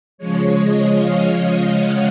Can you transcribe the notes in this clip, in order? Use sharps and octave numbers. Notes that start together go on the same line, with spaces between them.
C#3 F3 G#3 C#5
D#5
F5
F#5